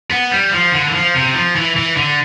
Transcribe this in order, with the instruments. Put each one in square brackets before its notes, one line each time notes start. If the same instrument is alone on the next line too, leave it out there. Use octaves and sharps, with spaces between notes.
[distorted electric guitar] B3
G3
F3
D3
E3
F3
C3
F3
E3
E3
D3